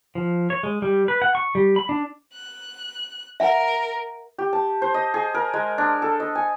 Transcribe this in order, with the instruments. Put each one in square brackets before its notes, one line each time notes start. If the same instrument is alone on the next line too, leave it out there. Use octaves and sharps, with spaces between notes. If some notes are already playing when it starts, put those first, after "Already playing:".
[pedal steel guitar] F3
C#5
G#3
G3
B4
F#5
C#6
G3
B5
D4
[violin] F#6
[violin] A#4 [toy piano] E5 F#5
[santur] G4
A5
C5
D#5
G#4
A#4
G#3
D4
A4
D#5
G#5